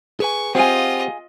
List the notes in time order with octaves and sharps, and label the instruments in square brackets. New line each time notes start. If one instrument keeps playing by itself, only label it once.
[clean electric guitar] G#4 B4 G#5 [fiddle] C#6
[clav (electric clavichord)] C4 [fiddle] F4 D#5 [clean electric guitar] G4 F#5 [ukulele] G#4 F5 G#5